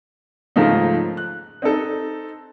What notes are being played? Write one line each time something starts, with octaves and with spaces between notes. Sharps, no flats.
G#2 C#3 F3 A3 A#3 D#4
F#6
C4 D#4 A4